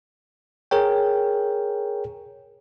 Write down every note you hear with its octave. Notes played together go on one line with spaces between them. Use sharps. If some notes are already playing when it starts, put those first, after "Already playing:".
G#4 A#4 C#5 G5